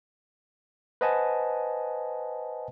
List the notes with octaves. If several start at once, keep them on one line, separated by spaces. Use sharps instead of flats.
B4 C5 D#5 F#5 G#5 A5